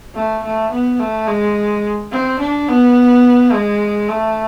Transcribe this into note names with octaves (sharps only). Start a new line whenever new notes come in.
A3
A3
B3
A3
G#3
C4
D4
B3
G#3
A3